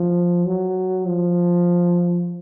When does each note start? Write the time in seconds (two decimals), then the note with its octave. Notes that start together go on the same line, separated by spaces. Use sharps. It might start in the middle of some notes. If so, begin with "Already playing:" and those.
Already playing: F3
0.45 F#3
1.06 F3